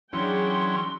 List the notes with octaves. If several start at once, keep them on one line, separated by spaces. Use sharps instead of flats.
E3 F#3 C#4 D4 G#4 G5 C6